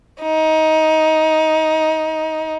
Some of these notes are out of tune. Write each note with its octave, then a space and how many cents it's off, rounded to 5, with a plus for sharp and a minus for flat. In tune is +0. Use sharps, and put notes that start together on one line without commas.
D#4 +20